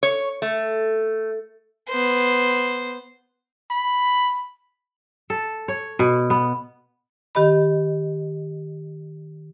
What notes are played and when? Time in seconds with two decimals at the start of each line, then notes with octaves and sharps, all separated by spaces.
0.03 C#5
0.42 A3
1.89 B3 C5
3.71 B5
5.30 A4
5.68 C#5
5.99 B2
6.30 B3
7.35 D#3 G4 D#5 B5